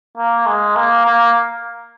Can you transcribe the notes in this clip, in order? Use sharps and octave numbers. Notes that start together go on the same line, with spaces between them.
A#3
G#3
A#3
A#3